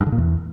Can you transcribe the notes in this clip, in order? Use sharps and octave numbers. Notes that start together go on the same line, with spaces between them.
G2
D3
A#2
E2